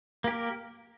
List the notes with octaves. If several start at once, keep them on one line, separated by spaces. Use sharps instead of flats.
A#3 G4 A#4